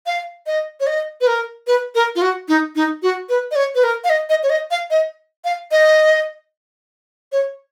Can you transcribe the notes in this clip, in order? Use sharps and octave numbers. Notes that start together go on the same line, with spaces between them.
F5
D#5
C#5
D#5
B4
A#4
B4
A#4
F4
F#4
D#4
D#4
F#4
B4
D#5
C#5
B4
A#4
F5
D#5
D#5
C#5
D#5
F5
D#5
F5
D#5
C#5